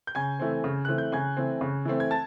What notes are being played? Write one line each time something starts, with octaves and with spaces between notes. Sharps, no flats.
G6
C#3 G#5 G#6
E3 A3 C4
C#3
E3 A3 C4 F#6
G6
C#3 G#5 G#6
E3 A3 C4
C#3
E3 A3 C4
G#6
A5 A6